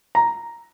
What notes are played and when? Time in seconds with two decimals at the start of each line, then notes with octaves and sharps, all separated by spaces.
0.15 A#5